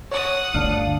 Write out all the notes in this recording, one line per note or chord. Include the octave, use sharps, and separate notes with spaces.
C#5 F#5 D#6
G1 D2 D4 F5